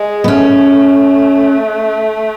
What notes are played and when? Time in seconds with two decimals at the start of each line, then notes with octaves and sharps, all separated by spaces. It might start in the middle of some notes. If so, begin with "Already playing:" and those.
Already playing: G#3
0.24 B3
0.28 A3 C#4